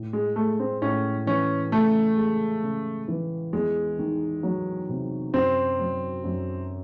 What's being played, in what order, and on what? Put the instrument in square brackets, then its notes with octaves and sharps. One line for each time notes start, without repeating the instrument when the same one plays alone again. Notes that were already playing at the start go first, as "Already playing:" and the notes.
Already playing: [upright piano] A2
[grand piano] G#3
[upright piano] G#3 [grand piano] A3
[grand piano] C4
[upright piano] A2 [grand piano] C#4
[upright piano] E3 [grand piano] C#4
[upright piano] C#3 [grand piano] A3
[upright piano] G#3
C#3
E3
[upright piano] E2 [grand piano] G#3
[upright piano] D#3
F#3
C3
[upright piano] F#2 [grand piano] C4
[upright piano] F#3
F#2